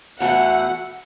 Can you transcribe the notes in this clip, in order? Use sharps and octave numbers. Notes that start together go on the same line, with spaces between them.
E2 B2 A3 F#5